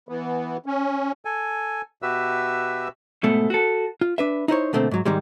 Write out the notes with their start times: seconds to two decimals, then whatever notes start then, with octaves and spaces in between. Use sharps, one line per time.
0.09 E3 B3
0.66 C#4
1.25 A4 G#5
2.02 B2 F#4 G4 B4 E5 E6
3.23 G#2 B2 A3
3.50 F#4 A4
4.01 F4
4.18 D4 B4 E5
4.48 D#4 E4 C5 C#5
4.73 B2 D3 A3 A#3 C4
4.91 G#2 F#3
5.05 G#2 D#3 G3 G#3